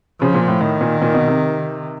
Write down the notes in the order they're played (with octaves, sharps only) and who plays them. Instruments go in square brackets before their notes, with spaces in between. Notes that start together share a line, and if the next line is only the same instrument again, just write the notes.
[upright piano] C#3 [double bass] F3
[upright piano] A#2
A2
[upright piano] A2 [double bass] D#3
[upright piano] A#2
A#2
B2
C3